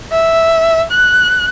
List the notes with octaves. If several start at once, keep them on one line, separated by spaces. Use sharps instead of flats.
E5
F#6